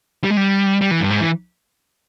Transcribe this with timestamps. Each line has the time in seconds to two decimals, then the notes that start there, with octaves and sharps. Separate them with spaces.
0.24 G3
0.31 G#3
0.37 G3
0.81 G3
0.91 E3
1.01 G2
1.10 G#2
1.20 E3